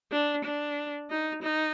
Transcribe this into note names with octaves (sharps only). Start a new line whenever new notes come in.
D4
D4
D#4
D#4